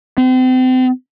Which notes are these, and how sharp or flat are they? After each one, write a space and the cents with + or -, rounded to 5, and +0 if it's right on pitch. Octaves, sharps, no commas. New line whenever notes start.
C4 -35